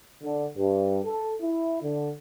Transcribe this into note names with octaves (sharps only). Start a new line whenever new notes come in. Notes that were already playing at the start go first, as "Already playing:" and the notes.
D3
G2
A4
E4
D3